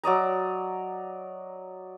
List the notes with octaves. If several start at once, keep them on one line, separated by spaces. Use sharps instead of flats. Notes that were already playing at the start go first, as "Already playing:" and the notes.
F#3 D5 D#5 A#5